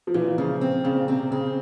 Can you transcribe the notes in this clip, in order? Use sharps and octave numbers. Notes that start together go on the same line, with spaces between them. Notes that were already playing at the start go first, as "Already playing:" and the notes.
F3
A#2 E3
C#3 F3
C4
A#2 C#3
C3 C4
C#3 C4